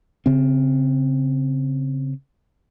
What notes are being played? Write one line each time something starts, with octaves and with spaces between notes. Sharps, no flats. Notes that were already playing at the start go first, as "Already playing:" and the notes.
C#3 C4